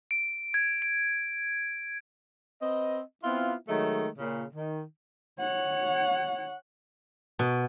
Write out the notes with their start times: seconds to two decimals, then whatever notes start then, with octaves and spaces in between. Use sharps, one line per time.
0.11 D7
0.54 G#6
0.82 D7
2.62 C4 B4 D#5
3.24 B3 C4 E4 F4
3.69 D#3 F#3 G#3 A3
4.18 A#2 C#3
4.54 D#3
5.40 C#5 F#5
7.39 B2